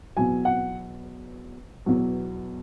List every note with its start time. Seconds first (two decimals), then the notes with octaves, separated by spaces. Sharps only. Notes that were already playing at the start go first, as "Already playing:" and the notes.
0.17 E2 B2 F#3 G#5
0.45 F#5
1.86 E2 B2 F#3